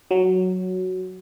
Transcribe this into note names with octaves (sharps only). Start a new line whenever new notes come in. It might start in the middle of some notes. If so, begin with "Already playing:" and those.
F#3